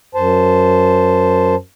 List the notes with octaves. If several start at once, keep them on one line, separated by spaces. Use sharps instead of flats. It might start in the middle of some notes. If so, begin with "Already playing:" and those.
F#2 C5 A5